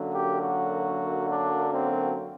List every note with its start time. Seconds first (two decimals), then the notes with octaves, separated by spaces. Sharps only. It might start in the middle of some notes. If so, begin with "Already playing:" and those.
Already playing: F#2 D3 F#3 A#3
0.13 G4
0.41 F#4
1.28 D4
1.71 C4